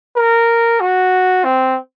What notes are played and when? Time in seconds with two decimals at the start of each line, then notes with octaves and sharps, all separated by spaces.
0.17 A#4
0.80 F#4
1.45 C4